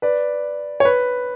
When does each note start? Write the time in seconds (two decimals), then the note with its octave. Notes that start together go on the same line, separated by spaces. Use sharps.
0.02 B4 D5
0.80 C#5
0.85 B4